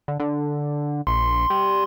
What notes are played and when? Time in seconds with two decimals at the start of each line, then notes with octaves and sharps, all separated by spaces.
0.08 D3
0.20 D3
1.07 A#1 C6
1.50 G3